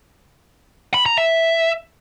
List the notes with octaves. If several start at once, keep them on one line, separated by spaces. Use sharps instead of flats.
B5
A#5
E5